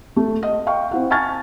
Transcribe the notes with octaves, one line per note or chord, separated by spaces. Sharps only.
A3
D#5
F5 G5 C#6
C4 E4 F#5
G#5 A5 C#6 F6 G#6 A6